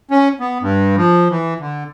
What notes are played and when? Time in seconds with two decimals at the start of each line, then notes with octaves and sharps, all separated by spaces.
0.11 C#4
0.40 B3
0.62 G2
0.97 F3
1.30 E3
1.60 D3